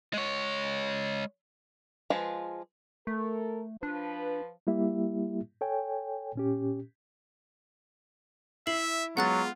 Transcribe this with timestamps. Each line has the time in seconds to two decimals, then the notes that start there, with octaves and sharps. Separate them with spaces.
0.14 G#3 C#5
2.10 F3 G#3 F4 G#4 B4
3.07 A3 A4 A#4
3.83 F3 D4 B4
4.67 G3 A#3 E4 G4 E5
5.61 A4 C#5 G5 G#5
6.36 A#2 C#4 G4
8.67 E4 E5 C7 F#7
9.17 F#3 G#3 B3 F4 F#5 F#6 A6